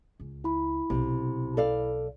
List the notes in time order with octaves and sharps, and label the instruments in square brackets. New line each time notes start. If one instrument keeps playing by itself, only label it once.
[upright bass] C#2
[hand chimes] E4 B5
[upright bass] B1 [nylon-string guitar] C3
[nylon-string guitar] A4 D5 F5